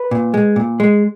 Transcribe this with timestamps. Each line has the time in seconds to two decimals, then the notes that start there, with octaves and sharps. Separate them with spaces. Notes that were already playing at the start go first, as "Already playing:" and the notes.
Already playing: B4
0.11 A#2
0.34 G#3
0.56 A#2
0.80 G#3